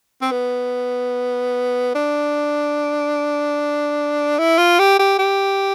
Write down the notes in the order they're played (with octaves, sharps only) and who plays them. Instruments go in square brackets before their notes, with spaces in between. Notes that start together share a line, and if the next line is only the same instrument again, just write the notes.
[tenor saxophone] C4
B3
D4
E4
F4
G4
G4
G4